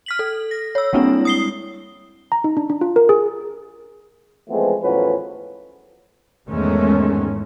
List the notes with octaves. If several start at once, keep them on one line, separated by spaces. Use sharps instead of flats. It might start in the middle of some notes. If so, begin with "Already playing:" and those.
F6 B6 F#7
A4
A#6
C#5 E6
G3 G#3 A#3 C4 D4 E4
D#6 C7 G7
A#5
D#4
D4
D4
F4
A#4
G#4
E3 F3 G#3 A3 B3 C4
E2 A2 F3 F#3 C#4 B4
E2 G#2 D#3 G#3 A3 C#4